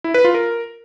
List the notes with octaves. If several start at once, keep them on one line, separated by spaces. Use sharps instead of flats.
E4
B4
F4
A#4